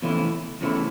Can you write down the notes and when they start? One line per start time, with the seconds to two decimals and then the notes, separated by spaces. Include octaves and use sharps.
0.02 E2 C#3 E3 A3 E4
0.61 E2 C#3 E3 A3 E4